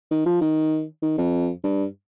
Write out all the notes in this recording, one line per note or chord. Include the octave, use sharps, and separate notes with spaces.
D#3
F3
D#3
D#3
F2
G2